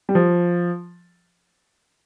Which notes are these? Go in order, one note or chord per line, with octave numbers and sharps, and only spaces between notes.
G3
F3